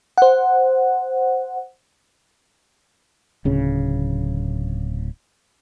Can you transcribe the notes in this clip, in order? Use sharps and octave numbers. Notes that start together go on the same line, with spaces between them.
C5 F#5
D1 C#3